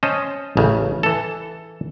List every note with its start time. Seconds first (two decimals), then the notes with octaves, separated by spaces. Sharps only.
0.03 C#4 C5 D#5 A5
0.57 A1 C#3
1.03 E3 A4